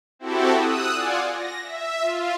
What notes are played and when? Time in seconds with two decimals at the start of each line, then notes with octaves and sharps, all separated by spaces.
0.19 C4 E4 F#4 G4 A4
0.55 D#6 E6 F#6
0.93 F4 D5 F#5 G#5
1.31 A#6
1.63 E5
2.02 F4